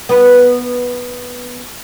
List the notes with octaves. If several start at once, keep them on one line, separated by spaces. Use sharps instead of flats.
B3 B4